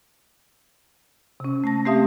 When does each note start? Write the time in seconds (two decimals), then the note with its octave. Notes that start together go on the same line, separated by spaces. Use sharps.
1.40 C3 C#4
1.64 A3 A5 A#6
1.86 A3 C4 G4 E5 F5 D#6